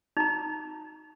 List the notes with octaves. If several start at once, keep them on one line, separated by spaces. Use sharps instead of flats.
D#4 A#5